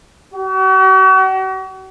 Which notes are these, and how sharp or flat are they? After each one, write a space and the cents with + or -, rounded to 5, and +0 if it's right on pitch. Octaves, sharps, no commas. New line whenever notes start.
F#4 +40